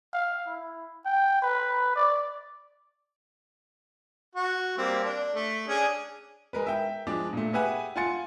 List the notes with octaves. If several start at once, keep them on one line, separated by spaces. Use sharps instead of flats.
F5
E4
G5
B4
D5
F#4
G3 A#3 C4
D4
A3
C#4 D4 G#4
G#3 A#4 B4
E5 G5
F3 G#3 D4 D5
A#2 A3
G4 G#4 B4 E5 F#5 G#5
F4 F#5 G#5 C6 A6 C#7